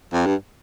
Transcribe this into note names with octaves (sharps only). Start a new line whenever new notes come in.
F2
G2